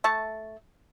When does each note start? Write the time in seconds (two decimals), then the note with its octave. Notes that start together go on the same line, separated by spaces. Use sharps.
0.04 A3 E5 A5 C#6